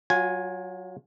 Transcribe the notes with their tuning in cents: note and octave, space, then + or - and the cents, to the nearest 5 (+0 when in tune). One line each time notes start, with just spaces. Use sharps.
F#3 +5 F4 +35 G#5 +0